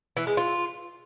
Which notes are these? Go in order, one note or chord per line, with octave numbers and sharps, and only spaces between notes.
E3
G#3
F4